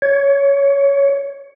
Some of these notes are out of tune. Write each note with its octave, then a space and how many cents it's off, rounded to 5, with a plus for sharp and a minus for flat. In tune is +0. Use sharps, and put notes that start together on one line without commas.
C#5 +10